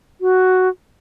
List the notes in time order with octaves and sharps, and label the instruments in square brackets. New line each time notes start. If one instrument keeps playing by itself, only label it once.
[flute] F#4